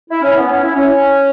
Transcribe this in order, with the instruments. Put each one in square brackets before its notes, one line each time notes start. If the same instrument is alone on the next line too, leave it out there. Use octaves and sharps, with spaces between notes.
[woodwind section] E4
C#4
B3
C#4
E4
C#4